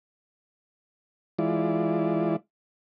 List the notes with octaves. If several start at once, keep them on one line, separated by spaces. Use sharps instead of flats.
E3 G#3 E4 F4 D5